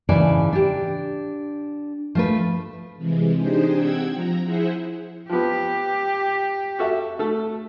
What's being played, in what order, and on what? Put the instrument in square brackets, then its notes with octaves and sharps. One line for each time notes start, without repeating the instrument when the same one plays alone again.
[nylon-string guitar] G#2 C#3 E3 D5 A5
D4 G4
F3 A3 B4
[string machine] C3 E3 G#3
D4 D#4 G4 G#4 C5
C4 F#5 G5 E6 G#6
F3 A#5
E4 G#4 C5 E5 F#5
[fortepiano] F3 B3 [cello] G4
[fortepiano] F#4 A4 E5
A3 A4